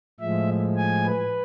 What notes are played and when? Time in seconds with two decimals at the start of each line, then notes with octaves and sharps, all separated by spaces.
0.20 A2 F3 G#3 E5
0.76 G#5
1.06 B4